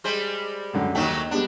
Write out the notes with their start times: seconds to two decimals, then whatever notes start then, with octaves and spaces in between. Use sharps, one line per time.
0.04 G3 G#3 C5
0.73 C#2 F#2 D3
0.95 D#2 D#3 F#3 A3 G5
1.31 G3 G#3 B3 D4